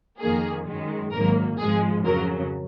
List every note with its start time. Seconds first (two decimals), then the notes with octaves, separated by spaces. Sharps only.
0.20 F2 D#3 A#3 G#4
0.66 F#2 D#3 G#3
1.12 G#1 G#2 F#3 A#3 A#4
1.58 G#1 G#2 F3 G#3 G#4
2.04 F2 C#3 F#3 A#4